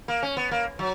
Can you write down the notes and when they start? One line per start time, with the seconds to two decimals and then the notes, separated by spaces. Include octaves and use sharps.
0.08 A#3
0.23 C#4
0.37 B3
0.51 A#3
0.79 F#3